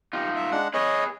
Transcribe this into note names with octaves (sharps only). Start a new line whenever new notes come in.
D#4 F4 G4
E5
G#3 D4 F#5
G#4 B4 C#5 D#5